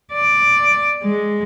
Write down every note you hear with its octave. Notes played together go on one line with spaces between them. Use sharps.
D5
G#3